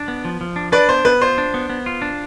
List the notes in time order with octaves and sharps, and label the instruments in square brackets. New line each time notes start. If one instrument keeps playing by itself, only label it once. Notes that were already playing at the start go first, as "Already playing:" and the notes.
Already playing: [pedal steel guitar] D4
B3
F3
F3
D4
[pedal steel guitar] D4 [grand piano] B4 D5
[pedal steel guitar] B3 [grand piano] C5
[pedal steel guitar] B3 [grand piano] B4
[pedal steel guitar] F4 [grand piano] C5
[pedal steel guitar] D4
B3
B3
F4
D4